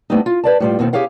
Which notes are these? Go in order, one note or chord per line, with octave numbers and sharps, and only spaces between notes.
G3 A3 B3 C4 D4 D#4
F4
B4 D5 A5
A2 G3 F4
D#2 B2 D#3 C4
E4 G4 G#4 C#5 F5 F#5